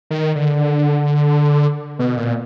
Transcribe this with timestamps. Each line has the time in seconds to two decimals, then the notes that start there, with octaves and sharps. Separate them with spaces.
0.10 D#3
0.35 D3
1.99 B2
2.17 A#2